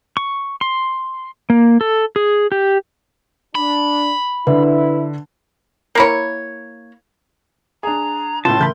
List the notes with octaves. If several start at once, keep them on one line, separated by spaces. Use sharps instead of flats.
C#6
C6
A#3
A4
G#4
G4
D4 B5
D3 E4 B4 E5
A#3 E4 C#5
D4 G#4 A#5
C#2 A2 F4 A5 C6
C#3 E3 A3 A#4 B5 G6